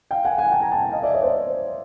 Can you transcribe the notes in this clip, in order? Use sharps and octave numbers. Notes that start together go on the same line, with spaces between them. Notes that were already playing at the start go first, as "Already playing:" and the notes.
F5 G5
F#5 G#5
F#5 G#5
G5 A5
G#5 A#5
G5 A5
G5 A5
D#5 F5
D5 E5
C#5 D#5
C5 D5